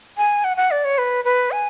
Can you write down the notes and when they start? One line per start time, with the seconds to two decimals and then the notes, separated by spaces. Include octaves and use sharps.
0.17 G#5
0.44 F#5
0.57 F#5
0.71 D5
0.85 C#5
0.98 B4
1.25 B4
1.51 G#5